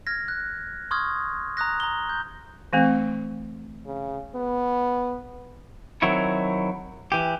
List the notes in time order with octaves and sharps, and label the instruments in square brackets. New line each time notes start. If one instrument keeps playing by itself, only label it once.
[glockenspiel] F6 G#6 A#6
F#6
C6 C#6 D#6 F6 G#6
A#5 D#6 F#6 A#6
A#5 G7
G6
[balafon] E3 A3 C4
[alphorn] C#3
B3
[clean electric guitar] D#3 F#3 C4 E4 C#5
E3 G4